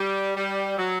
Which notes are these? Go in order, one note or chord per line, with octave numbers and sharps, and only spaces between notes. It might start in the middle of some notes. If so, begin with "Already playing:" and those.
Already playing: G3
G3
F#3